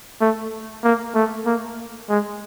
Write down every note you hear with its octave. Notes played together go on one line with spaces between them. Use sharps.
A3
A#3
A3
A#3
G#3